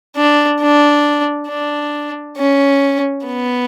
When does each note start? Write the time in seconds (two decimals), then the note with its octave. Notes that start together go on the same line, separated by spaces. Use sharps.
0.16 D4
0.61 D4
1.49 D4
2.37 C#4
3.27 B3